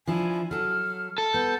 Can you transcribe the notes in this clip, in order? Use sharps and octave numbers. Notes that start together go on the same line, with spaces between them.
F3 D4 E4 G#5
F#3 A4 F6
A4
B3 G6